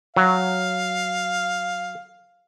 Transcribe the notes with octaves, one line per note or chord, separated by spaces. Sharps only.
F#3 F5